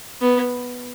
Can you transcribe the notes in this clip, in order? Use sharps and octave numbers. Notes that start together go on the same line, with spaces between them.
B3